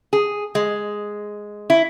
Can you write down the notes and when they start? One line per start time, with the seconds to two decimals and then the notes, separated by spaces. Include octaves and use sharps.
0.13 G#4
0.55 G#3
1.70 E4